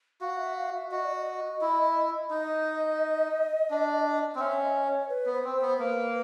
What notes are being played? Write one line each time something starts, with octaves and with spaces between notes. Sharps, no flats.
F#4 F5
E5
F5
E5
F#4 D#5
D5
D#5
E4
D#4 D#5
D4
C4
C#4 E5
D#5
C#5
B4
B3
C5
C4
C5
B3
A#3 B4